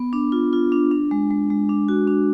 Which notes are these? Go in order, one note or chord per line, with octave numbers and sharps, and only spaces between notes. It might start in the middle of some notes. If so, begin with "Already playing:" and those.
Already playing: B3
D4
F4
F4
D4
D4
G#3
G#3
G#3
D4
F#4
D4